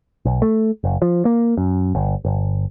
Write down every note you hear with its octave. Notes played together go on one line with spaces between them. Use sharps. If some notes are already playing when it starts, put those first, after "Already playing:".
B1
A3
F#1
F3
A#3
F#2
G1
G1